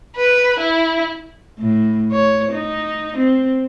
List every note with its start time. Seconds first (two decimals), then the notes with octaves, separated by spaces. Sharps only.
0.16 B4
0.60 E4
1.59 A2
2.12 C#5
2.52 D#4
3.17 C4